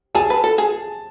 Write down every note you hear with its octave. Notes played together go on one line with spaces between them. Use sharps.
G#4 A5
B4
A4
G#4